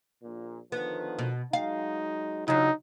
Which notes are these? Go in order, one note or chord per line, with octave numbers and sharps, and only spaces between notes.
A#1 A#2
D3 D#3 F3 B3
B2
F#3 G#3 D#4 F5
C#3 F#3 D4 D#4 F4 F#4